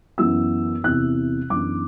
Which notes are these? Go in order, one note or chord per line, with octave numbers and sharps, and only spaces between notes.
F#2 E3 B3 E4 E6
E2 C3 E3 F#6
F#2 E3 B3 D4 D6